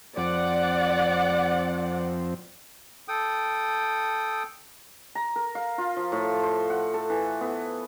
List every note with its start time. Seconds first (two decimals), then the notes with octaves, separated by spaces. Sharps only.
0.17 F2 C4 D5 F#5
3.08 A4 G5 D#6
5.15 A#5
5.36 A#4
5.55 F5
5.78 F4
5.96 F3
6.12 A2
6.43 C5
6.70 F#5
6.94 A4
7.10 E3
7.41 B3